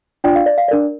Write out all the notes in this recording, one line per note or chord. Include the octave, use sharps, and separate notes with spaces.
D4 F4 D5 G5
F5
D5
F5
D4 A#4 D5